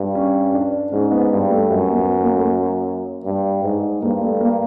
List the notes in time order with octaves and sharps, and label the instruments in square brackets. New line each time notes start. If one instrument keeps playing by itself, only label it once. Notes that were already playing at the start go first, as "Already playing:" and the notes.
Already playing: [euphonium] G2
[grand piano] C#4
D4
[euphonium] G#2 [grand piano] C#4
[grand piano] B3
[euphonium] G2
[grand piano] A3
[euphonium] F#2 [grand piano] G3
[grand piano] A#3
B3
A#3
A3
A#3
[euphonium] G2
G#2
[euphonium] G2 [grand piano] A#3
[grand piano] A3
A#3